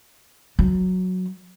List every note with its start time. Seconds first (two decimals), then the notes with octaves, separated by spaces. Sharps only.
0.59 F#3